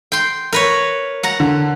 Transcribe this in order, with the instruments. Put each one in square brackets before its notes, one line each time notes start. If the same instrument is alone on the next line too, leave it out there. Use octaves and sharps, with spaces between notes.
[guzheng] G5 C6
A#4 B4 C#5
F#5 A#5
[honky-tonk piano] D3